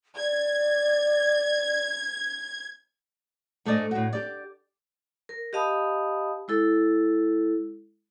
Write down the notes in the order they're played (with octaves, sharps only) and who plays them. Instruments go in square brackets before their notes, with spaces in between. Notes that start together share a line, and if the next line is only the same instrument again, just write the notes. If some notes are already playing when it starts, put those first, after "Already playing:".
[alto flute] D5 [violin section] G#6
[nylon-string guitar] G#2 A3 D4 D5 D#5
A2 F#4
G4 D5
[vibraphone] A#4
G4 D#5 F5 A5 B5 D#6
G#3 E4 A4